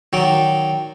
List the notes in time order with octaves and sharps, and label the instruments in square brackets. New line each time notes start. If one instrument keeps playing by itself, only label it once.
[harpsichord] D#3 F#3 D5